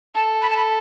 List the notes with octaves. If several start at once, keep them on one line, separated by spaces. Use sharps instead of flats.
A4 A5
B5
A5
B5